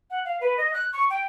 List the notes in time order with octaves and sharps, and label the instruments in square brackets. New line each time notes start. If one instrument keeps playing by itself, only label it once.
[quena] F#5
F5
B4
D#5
F#6
C#6
G5